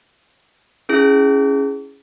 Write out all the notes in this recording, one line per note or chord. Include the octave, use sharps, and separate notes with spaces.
C#4 E4 G#4